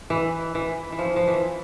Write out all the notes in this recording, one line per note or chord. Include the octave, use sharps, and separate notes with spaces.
E3
E3
E3
F3
F3
E3